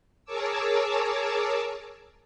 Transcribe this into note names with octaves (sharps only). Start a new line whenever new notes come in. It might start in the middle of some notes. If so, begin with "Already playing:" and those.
G#4 A#4 C#5 A5 D6 E6